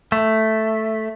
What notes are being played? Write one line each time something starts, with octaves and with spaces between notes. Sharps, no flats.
A3